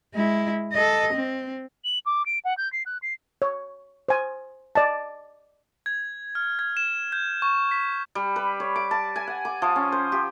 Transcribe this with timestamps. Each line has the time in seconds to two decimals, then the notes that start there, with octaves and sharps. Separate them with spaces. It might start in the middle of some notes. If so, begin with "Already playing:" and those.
0.14 G#3 E4
0.73 A4 D#5
1.13 C4
1.84 F#7
2.06 D6
2.26 D7
2.45 F#5
2.57 G6
2.73 C7
2.86 F#6
3.02 C7
3.42 C#5
4.09 C5 G#5
4.75 D5 D#5 A5
5.86 G#6
6.35 F6
6.59 G#6
6.77 E7
7.12 G6
7.42 C#6
7.71 B6
8.15 G3
8.36 B4
8.60 C#5
8.76 D6
8.91 A5
9.16 G#5
9.27 F#5
9.45 D6
9.62 F3
9.76 C#4
9.92 C5
10.12 G4